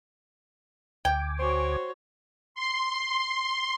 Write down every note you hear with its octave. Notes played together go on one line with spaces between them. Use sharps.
D2 G5 G#5 D6
F#4 C5 C#5
C6